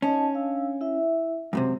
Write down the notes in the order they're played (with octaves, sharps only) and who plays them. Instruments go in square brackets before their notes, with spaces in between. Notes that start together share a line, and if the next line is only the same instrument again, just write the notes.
[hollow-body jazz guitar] C#4 [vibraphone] D#4 D#5 A5
[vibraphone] D4 F5 E6
E4 E5
[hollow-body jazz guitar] F#2 A2 C3 [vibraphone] G#3